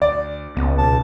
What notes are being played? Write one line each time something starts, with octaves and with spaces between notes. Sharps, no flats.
D2 D5
C#2 B3
B1 B2 A5